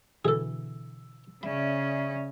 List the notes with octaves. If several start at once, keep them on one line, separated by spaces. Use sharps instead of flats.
B2 D3 E3 G#4 A4 E6
C#3 C#4 D5 E5 B5